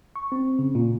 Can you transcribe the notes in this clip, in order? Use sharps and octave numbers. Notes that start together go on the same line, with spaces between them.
C#6
C4
C#3
A#2